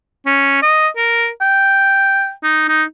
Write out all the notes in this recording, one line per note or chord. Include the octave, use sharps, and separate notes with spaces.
C#4
D#5
A#4
G5
D#4
D#4